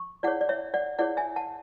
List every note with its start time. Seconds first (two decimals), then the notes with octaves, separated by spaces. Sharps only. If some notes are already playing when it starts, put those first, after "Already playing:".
Already playing: C#6
0.23 E4 G#4 C#5 D5 F#5
0.41 D5
0.49 C#5 E5
0.74 D5 F#5
0.99 E4 G#4 C#5 D5 F#5
1.17 E5 G#5
1.36 F#5 A5